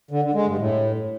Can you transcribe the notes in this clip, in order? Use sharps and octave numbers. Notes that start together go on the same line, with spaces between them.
D3
D3
G#3
G2
A2